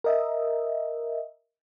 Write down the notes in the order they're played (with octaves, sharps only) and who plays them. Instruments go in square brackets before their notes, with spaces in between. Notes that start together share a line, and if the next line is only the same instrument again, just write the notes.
[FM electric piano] A#4 D#5 E5